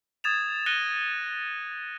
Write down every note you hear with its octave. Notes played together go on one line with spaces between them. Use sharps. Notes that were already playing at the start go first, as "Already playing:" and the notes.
D#6 G#6 A6 E7 F7
F#6 A#6 C#7 D#7 F7 G7
G7